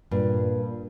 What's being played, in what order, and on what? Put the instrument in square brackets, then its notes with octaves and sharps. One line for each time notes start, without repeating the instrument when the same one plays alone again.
[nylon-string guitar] G2 [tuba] A#2